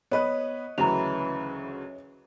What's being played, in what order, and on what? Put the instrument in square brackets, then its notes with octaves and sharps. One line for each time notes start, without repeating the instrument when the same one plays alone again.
[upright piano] B3 B4 [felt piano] C#5 D#5 F#6
[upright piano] D2 C#3 F#3 [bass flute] E3 [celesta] A#5 F7